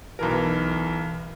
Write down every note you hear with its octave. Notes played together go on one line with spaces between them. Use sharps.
B1 E3 A#4